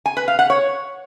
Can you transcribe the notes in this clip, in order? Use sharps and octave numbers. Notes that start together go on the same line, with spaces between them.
G#5
B4
F5
F#5
C#5